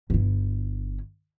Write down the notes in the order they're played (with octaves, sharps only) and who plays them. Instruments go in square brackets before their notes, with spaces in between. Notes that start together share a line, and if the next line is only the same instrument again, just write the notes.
[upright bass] G1 E4